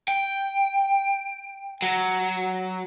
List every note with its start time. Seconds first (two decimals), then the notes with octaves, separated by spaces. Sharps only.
0.08 G5
1.82 F#3